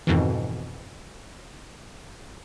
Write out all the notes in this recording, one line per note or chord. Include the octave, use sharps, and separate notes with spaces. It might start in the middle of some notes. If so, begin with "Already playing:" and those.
F2 G#2 B2 D#3 E3